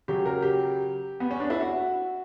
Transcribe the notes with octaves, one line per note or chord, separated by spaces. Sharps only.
C#3 F#3 G4
A#4
G4
B3
C#4
D4
E4
F#4